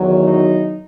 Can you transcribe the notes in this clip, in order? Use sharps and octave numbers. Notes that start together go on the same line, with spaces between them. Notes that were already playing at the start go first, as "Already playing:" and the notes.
Already playing: E2 D#3 F#3
D#4